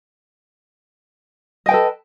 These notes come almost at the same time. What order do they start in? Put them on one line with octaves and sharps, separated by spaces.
D#5 G5 B4 A4